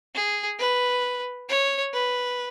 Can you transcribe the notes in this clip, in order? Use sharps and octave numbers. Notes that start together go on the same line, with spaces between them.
G#4
B4
C#5
B4